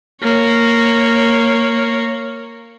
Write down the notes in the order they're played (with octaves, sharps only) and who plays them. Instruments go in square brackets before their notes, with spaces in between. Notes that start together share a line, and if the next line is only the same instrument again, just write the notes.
[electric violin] A#3 C#5